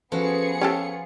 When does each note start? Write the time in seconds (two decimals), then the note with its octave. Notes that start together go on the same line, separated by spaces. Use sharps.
0.12 F3 B3 C#4 F#4 G#4 A4 B4 C#7
0.61 C#4 F4 G4 A4 C#6